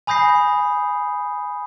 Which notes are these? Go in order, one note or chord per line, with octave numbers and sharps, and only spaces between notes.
G#5 B5 D#6 G6 A#6 C7